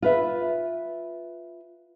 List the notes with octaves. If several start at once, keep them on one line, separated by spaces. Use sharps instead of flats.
F4 B4 E5